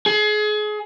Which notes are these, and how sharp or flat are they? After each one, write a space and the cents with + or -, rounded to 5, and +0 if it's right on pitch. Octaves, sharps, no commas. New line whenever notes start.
G#4 +30